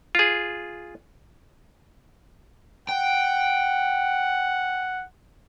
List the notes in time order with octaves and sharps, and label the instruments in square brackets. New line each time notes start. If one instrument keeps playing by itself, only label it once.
[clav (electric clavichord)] F4 G#4
[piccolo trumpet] F#5 [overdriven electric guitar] G5